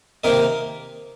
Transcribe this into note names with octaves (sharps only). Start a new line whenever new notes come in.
C3 D#3 A#3 D#4 A#4 D#5